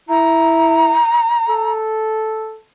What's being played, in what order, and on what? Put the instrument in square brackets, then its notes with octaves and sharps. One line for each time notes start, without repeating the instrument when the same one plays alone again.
[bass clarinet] E4 [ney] A#5
[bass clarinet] A4